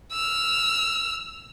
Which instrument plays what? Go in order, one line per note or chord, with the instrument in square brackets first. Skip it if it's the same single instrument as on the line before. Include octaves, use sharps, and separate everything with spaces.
[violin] E6 F6